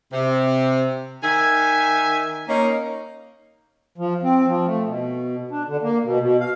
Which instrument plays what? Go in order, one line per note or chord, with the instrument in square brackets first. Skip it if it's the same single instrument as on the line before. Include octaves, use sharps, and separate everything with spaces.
[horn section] C3
D#3 E5 G#5
A#3 C#4 D#4
[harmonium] F3
C4
F3
A3
B2
D4
D3
A#3
B2
B2
F5